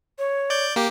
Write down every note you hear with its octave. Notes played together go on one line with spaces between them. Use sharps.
C#5
D5 G6
A#3 G4